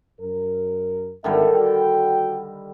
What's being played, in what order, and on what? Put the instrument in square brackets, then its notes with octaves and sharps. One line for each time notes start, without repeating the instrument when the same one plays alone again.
[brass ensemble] F#2 A#4
[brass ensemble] G#1 D4 E5 [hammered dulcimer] D3 D#3 G3
[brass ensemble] F#4 G5